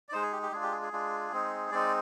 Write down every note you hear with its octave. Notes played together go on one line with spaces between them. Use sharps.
D5
G#3 D#4 C5
G#4
G4
G4
G#3 D4 F4 G#4
G4
G#4
G#4
G#3 D4 F4
G#3 C4 D#4
G#3 C4 D#4 D5